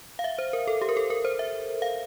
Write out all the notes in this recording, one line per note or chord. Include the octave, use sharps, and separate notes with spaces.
F5
E5
C5
A#4
A4
G4
A#4
A4
A#4
C5
E5
F5